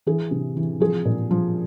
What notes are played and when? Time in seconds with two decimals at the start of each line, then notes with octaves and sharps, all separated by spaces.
0.07 E3 G#4
0.31 C3
0.57 E3
0.80 F3 G#4
1.05 A#2
1.31 F3